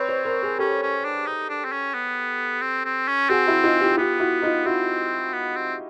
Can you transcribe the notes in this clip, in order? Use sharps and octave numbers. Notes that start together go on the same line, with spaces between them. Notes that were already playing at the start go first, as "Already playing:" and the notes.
Already playing: C4 B4 C#5
C5 D5
A#4 C5
G#4 A#4
C#4 G4 A4
C#4
D4
D#4
D4
C4
C#4
B3
C4
C4
C#4
C4 F#4 G#4
E4 F#4
D#4 F4
F4 G4
B3 F4 G4
E4 F#4
D#4 F4
C4 E4 F#4
B3
C4